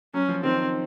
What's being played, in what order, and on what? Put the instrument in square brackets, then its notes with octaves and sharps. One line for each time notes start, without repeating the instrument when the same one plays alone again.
[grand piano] F#3 [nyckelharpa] C#4
[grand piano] F3
[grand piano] D#3 [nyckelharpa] C4